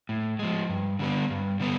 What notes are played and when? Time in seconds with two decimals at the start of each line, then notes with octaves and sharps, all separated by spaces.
0.09 A2
0.39 F3 G#3
0.69 G2
0.99 D3 G3 B3 D4
1.30 G2
1.60 D3 G3 B3